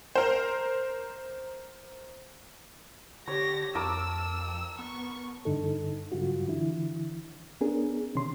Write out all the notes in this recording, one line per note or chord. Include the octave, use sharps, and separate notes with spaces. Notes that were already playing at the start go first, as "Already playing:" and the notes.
A#4 C5
D3 G4 C#5 A#6
F2 A#4 A5 D6 E6
B3 C#6
G2 D3 D#4 A4
G2 C#3 F#3 F4 F#4
D3 E3 E4
B3 C#4 D4 G#4 A#4
C3 D#3 C#4 C6